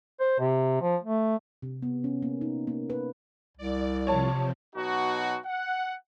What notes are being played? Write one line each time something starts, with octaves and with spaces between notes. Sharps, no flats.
C5
C3
F3
A3
C3
B3
C#4
A#3
D#4
A#3
B4
C2 D5
C3 F3 C#5 A5
B2 F#3 D#4 F#4
F#5